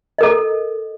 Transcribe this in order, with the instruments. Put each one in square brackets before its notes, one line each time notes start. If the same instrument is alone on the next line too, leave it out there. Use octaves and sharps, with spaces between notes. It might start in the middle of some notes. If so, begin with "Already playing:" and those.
[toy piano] A4 A#4 D#5